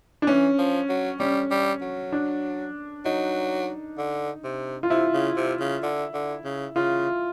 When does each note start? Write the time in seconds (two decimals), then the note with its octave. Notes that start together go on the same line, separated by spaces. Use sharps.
0.22 D4
0.27 E3 C#4
0.58 F3
0.89 F#3
1.20 G3 C#4
1.51 G3
1.81 F#3
2.12 D4
3.05 F#3 D#4
3.98 D3
4.44 C3
4.83 F4
4.90 C3 E4
5.13 C#3
5.37 C3
5.60 C#3
5.83 D3
6.14 D3
6.45 C#3
6.75 C#3 F4